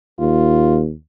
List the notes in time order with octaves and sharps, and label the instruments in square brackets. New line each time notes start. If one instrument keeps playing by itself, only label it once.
[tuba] D#2 [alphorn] F4